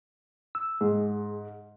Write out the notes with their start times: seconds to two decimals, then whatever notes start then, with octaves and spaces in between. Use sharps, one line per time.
0.55 E6
0.81 G#2 G#4